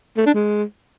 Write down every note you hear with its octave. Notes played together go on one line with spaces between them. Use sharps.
A3
D4
G#3